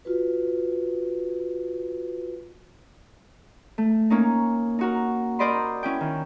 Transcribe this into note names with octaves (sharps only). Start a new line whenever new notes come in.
F4 F#4 B4
A3
A#3 C#4 D#4
D#4 F#4 A#4
A#4 C5 D5 D#5 B5 C6
C#4 E4 G5
D#3